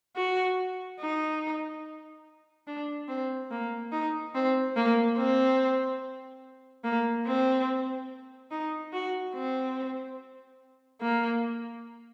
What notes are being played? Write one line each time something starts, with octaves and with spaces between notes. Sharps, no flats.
F#4
D#4
D4
C4
A#3
D#4
C4
A#3
C4
A#3
C4
D#4
F#4
C4
A#3